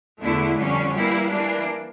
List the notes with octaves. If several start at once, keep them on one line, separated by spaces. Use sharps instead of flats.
E2 D3 A3 E4
F2 D3 G3 C#4
E3 G3 A#3 E4
E3 A#3 D4